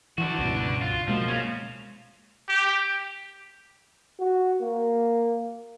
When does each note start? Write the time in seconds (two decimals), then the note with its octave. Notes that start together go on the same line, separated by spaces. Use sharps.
0.18 E3 D4 F#4
0.38 C#2 G2 B2
0.81 F4
1.08 B2 F3 G#3 A#3
1.28 C#4 F5
2.49 G4
4.20 F#4
4.61 A#3